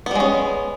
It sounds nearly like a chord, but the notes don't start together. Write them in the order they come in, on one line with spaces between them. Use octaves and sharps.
B3 G3 G#3 C#4